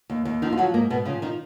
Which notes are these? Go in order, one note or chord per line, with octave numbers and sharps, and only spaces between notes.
D#2
D#2
D#3 F3 D#4
F4
F3 F#3 F#4
G#2 A#3
G#2 B2 B3
C#3 F3 C#4
D#3 F3 D#4